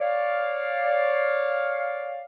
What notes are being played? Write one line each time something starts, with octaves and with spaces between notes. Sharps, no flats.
C#5 D5 F5